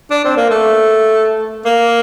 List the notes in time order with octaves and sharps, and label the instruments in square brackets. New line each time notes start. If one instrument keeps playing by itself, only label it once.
[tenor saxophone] D4
C4
A#3
A3
A#3